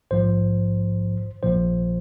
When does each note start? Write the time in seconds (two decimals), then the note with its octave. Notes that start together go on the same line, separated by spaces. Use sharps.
0.11 A#1 G#2 F3 C5
1.43 A#1 A#2 F3 C5